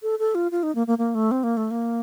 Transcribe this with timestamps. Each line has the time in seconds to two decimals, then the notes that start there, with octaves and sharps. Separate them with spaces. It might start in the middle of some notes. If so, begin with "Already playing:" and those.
0.03 A4
0.19 A4
0.35 F4
0.51 F4
0.63 D#4
0.75 A#3
0.87 A#3
0.98 A#3
1.15 A3
1.31 C4
1.44 A#3
1.57 A3
1.71 A#3